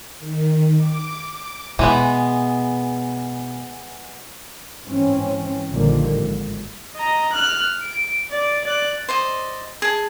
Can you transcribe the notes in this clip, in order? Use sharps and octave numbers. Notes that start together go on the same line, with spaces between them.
D#3
D6
B2 E3 G#3 B3
G#2 E3 C4 C#4
A#1 D3 D#3 F3 G3 A#3
G#1
D#5 A#5
F6 F#6
D7
D5
D5 F#6
C5 D5 D#5
G#4 A5